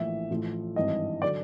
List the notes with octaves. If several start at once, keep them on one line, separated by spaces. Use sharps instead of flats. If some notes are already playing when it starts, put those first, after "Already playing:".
Already playing: A#1 A2 E3 E5
A1 A2 F3
G#1 G2 E3 D#5
D3 F#3 D5